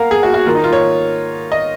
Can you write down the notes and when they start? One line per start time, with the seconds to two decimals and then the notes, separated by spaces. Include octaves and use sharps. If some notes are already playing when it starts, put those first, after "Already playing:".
Already playing: A#3 A#4 F5 F#5
0.11 G#4
0.23 F#4
0.34 F#4
0.46 D#3 A#3 F4
0.55 D#4
0.64 F4
0.73 C#5
1.52 D#5